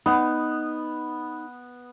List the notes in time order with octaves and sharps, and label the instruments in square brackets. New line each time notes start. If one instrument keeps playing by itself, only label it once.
[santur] B3 [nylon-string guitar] D#4